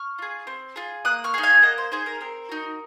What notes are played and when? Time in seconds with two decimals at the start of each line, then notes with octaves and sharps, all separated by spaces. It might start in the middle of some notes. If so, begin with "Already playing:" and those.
Already playing: C#6 F6
0.18 F4 G#4
0.47 C4
0.76 F4 G#4
1.05 A#3 D#6 F#6
1.24 C#6 F6
1.34 D#4 G#4
1.43 F5 G#5
1.62 A#3 D#5 F#5
1.78 C5
1.92 D#4 G#4 C5
2.06 A#4
2.21 C4 A#4
2.49 D#4 F#4